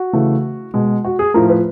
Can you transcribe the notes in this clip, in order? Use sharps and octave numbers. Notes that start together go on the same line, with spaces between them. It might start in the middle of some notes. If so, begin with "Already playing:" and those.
Already playing: F#4
C#3 E3 A3
B2 G#3
F#4
G#4
A2 F3 A3 A#4
B4